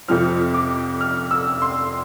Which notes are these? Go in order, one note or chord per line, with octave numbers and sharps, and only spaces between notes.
F2 C3 F3 C4 F6
D6
F6
E6
C6